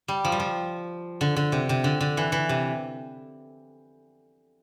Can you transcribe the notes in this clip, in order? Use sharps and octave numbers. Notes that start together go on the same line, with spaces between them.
G3
F3
G3
F3
D3
D3
C3
C3
D3
D3
E3
E3
C3